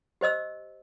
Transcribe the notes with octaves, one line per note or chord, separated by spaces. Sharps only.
G4 C5 D#5 E6